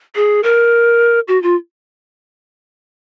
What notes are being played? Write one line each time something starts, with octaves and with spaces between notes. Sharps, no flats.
G#4
A#4
F#4
F4